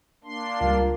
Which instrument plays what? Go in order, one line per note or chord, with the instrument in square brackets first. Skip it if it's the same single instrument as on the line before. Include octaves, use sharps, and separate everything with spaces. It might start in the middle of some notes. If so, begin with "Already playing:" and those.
[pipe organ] A#3 D4 C6
[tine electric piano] C#2 G3 [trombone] F4 [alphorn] A#4